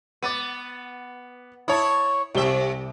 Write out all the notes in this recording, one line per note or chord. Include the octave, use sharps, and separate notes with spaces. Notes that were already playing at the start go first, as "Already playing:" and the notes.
B3 D6 A6 D#7
E4 C#5 A5 D#6
C2 C3 G4 E5 G7